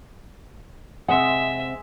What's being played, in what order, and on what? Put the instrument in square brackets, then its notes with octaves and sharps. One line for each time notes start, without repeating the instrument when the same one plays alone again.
[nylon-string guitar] C3 C4 F#5 [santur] G#3 E6 [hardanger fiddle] E5